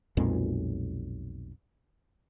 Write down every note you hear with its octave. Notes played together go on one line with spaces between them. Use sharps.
B1 F2 A#2 G#3